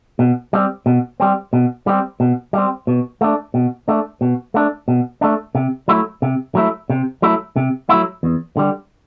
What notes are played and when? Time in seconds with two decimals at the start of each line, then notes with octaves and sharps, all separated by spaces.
0.19 B2
0.53 G3 C4
0.86 B2
1.20 G3 C4
1.53 B2
1.87 G3 C4
2.20 B2
2.53 G3 C4
2.87 B2
3.21 A3 D4
3.54 B2
3.88 A3 D4
4.21 B2
4.54 A3 D4
4.88 B2
5.21 A3 D4
5.55 C3
5.88 F#3 A3 E4
6.22 C3
6.55 F#3 A3 E4
6.90 C3
7.22 F#3 A3 E4
7.56 C3
7.89 F#3 A3 E4
8.23 E2
8.57 D3 G3